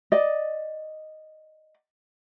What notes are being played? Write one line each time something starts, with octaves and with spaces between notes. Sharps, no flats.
D5 D#5